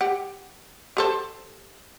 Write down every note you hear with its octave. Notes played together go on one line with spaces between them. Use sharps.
G4 F#5
G4 A4 C5